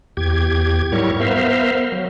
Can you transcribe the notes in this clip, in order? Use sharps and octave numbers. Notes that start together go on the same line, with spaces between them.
E2 G4 G#6
G#2 F#3 G3 E4 A#4 C#6
B3 A#4 C5 E5 F5
F#3